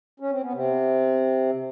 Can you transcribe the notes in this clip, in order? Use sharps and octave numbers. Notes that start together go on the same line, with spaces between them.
C#4
C4
B3
C3 C4